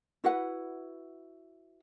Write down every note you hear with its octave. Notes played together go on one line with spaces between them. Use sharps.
E4 F#4 B4 F#5